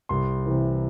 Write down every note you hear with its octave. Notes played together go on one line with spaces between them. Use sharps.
C2 C6
C3 E3